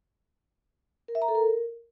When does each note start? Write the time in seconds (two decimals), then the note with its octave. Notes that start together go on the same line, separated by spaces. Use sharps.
1.08 A#4
1.15 E5
1.22 A#5
1.28 A4
1.35 A#4